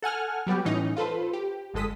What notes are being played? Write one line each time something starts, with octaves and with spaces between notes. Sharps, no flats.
A4 F#5 G#5 F6
F#3 G3 B3 G4
A2 E3 C#4 D#4
F4 A4 B4 C5
G4
G1 F2 G#3 A4 D#6 B6